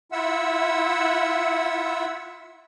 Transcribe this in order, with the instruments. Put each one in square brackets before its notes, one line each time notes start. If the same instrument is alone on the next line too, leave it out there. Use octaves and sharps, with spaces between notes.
[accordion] E4 F4 E5 F#5 E6